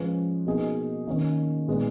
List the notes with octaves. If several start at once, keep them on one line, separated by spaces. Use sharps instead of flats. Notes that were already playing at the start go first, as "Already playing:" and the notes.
Already playing: F3 G#3 C#4 G#4 B4
B2 A#3 D#4 G#4
D#3 A#3 C#4
A#2 G#3 B3 D#4